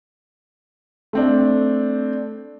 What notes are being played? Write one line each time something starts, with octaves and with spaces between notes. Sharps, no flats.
A3 C4 D4